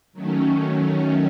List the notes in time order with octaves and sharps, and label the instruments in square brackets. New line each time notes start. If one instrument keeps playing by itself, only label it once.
[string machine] D#3 F#3 A3 C#4